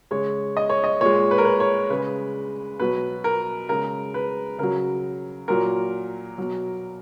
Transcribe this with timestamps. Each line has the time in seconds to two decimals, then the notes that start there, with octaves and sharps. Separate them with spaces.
0.11 C#3 G#3 C#5
0.57 D#5
0.70 C#5
0.84 D#5
1.00 A#2 G#3 C#5
1.31 B4
1.38 A#4
1.45 B4
1.60 C#5
1.90 C#3 G#3 B4
2.79 B2 F#3 B4
3.24 A#4
3.69 C#3 G#3 A#4
4.14 B4
4.59 C#3 F#3 A#4
5.48 A#2 F#3 A#4
6.38 B2 F#3